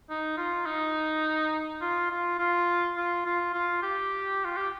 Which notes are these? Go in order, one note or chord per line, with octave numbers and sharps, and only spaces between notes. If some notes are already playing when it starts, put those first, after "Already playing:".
D#4
F4
D#4
F4
F4
F4
F4
F4
F4
G4
F4
G4